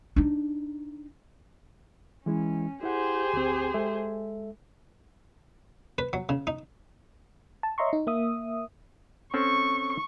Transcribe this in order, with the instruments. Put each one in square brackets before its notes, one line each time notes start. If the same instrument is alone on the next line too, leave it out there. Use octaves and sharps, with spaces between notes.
[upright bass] D4 D#4
[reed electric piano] E3 G#3 E4 [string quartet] C#4
[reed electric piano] E4 F#5 [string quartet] G4 G#4 C5
[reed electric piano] D2 C4
G#3 A4 E5
[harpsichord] B4
F#3
C#3
D#4
[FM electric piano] A5
C#5 D#5 E5 A#5 C6 C#6
D#4
A#3 E5 D#6
[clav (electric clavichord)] C4 C#4 A4 [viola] C#6